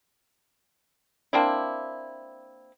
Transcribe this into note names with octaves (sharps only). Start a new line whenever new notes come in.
A#3 C4 D4 E4